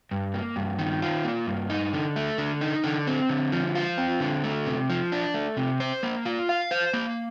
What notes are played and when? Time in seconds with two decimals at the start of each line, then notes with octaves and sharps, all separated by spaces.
0.11 G2
0.34 A#3
0.56 G2
0.79 D#3
1.02 F4
1.24 A#3
1.47 G2
1.70 D#4
1.93 D3
2.16 A3
2.38 D3
2.61 D#4
2.84 D3
3.07 C4
3.29 D3
3.52 F3
3.75 F4
3.98 C4
4.20 D3
4.44 A3
4.66 C3
4.90 F3
5.12 D4
5.34 A3
5.57 C3
5.80 C5
6.03 A#3
6.25 F4
6.49 F5
6.71 C5
6.94 A#3